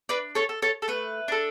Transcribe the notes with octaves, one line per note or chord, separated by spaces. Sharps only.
D4 B4 D5
A4 C#5
A4
A4 C#5
A4
A3 B4
D4 A4